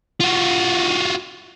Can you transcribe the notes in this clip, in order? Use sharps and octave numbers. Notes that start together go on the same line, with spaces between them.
F4 F#4